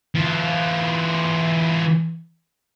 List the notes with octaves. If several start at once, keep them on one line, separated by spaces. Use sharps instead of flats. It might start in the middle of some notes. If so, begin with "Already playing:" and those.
E3 F4